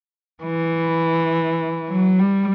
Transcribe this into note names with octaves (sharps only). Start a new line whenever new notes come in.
E3
F#3
G3